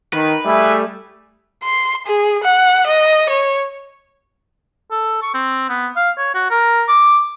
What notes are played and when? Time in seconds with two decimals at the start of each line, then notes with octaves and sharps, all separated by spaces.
0.14 D#3 B4
0.46 G3 A3 E4 G#4 E5
1.63 C6
2.06 G#4
2.43 F#5
2.87 D#5
3.29 C#5
4.91 A4
5.22 C#6
5.34 C4
5.69 B3
5.97 F5
6.18 C#5
6.34 F#4
6.51 A#4
6.88 D6